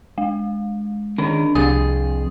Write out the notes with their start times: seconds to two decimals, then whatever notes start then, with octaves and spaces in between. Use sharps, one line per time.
0.18 G#3
1.18 D#3 C#4 D4 A#4
1.55 C2 F2 G#4 D#6